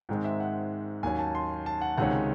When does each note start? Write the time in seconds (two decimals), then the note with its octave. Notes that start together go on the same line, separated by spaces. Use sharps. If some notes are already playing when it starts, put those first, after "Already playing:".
0.09 G#2 D#3 G#3 C4
0.24 E5
0.40 F#5
1.03 D#2 D#3 F#3 C#4 G#5
1.19 A5
1.35 C6
1.66 A5
1.81 F#5
1.97 C#2 C3 D#3 G#3 C#4 F#5